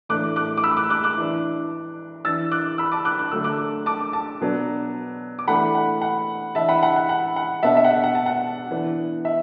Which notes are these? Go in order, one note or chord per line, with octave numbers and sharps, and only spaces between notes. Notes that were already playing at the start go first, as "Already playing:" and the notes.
A2 E3 A3 D4 D6 F#6
D6 F#6
D6
B5 E6
D6 F#6
D6 F#6
D6 F#6
E3 D4
E3 D4 E6 A6
D6 F#6
B5 E6
A5 D6
D6 F#6
F#6
D3 F#3 A3 E6
D6 F#6
A5 D6
A5 D6
B2 F#3 B3 D4
D6
E3 A3 D4 F#5 B5
F#5
F#5
E3 D4 E5 A5
F#5 B5
F#5
F#5
F#5
F#5
B2 B3 D4 E5 A5
E5
F#5
E5
F#5
A5
F#5
E3 B3 D4
E5